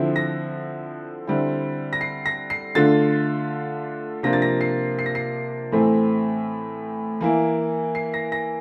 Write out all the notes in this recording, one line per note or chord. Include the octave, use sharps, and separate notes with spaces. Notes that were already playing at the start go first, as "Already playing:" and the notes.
Already playing: D3 F3 C4 E4
A#6
D3 G3 C4 E4
A#6
C7
A#6
C7
D3 A3 D4 F4 A6
C3 F3 A#3 D4 F4 A#6
A6
A#6
C7
C7
A#6
C7
A2 E3 A3 C4
E3 A#3 E4
C7
A#6
A#6